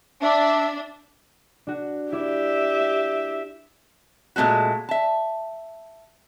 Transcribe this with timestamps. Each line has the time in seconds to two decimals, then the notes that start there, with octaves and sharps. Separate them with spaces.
0.21 D4 E5
1.67 D4 F#4
2.12 E4 G4 D5 E5
4.36 A#2 G#3 A3 C4 F#4
4.89 E5 A5